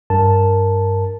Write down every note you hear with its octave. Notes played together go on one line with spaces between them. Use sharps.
G2 A#4 A5